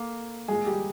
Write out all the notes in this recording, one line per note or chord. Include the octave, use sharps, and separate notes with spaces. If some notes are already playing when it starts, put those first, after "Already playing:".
Already playing: A#3 A4
G#3 G#4
G3 G4